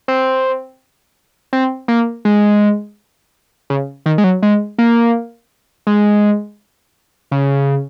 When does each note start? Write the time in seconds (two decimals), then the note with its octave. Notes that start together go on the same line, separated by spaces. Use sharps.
0.08 C4
1.53 C4
1.88 A#3
2.25 G#3
3.70 C#3
4.06 D#3
4.18 G#3
4.24 F#3
4.43 G#3
4.78 A#3
5.87 G#3
7.31 C#3